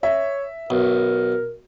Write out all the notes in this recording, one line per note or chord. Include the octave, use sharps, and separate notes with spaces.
C#5 E5
B1 A#4